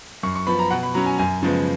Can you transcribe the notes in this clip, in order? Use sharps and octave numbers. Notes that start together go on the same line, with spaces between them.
F#2 C#6
C#6
F3 B3 B5
A#5
B2 F#5
B5
F#3 C#4 A#5
G#5
F#2 G#5
C#3 F3 G#3 B3